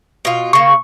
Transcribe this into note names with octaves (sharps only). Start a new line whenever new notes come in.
B2 F4
C#3 A#3 C#6